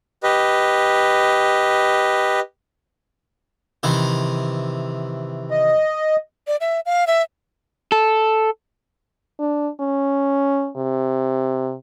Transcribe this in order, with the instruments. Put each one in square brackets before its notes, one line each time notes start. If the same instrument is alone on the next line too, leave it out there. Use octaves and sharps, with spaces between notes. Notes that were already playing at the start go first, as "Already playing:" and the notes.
[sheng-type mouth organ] G4 B4 D#5
[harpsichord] C3 D#3 E3
[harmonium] D#5
[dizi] D5
E5
F5
E5
[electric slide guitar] A4
[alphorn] D4
C#4
C3